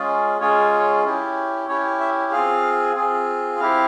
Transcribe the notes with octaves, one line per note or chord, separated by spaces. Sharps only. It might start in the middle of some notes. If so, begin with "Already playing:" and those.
Already playing: G#3 C#4 F4 G#4
G#3 C#4 F4 G#4 C#5
C#4 E4 G4
C#4 E4 G4 C#5
E5
C4 F4 G#4 F5
C4 F4 G#4
C4 E4 G4 F5